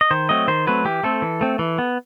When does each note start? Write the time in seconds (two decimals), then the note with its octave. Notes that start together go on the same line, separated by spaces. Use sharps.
0.01 D#5
0.11 D#3 C5
0.29 F#3 A3 C4 D#5
0.48 D#3 C5
0.67 F#3 A3 C4 B4
0.85 E3 G4
1.03 A3 C4 A4
1.22 E3
1.41 A3 C4
1.59 E3
1.78 B3